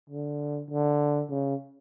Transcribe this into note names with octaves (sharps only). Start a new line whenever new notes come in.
D3
D3
C#3